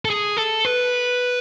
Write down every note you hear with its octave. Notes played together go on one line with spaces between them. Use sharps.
A4
G#4
A4
B4